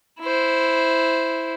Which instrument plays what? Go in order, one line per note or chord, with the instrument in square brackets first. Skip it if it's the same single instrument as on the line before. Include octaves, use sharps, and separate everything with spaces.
[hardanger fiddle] E4 C5